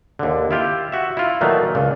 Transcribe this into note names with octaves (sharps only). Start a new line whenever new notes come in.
D#2 D3
E4 F4 G4
F#4 E5
E4 F4
A#2 D#3 E3 F#3 A3
C#2 A#2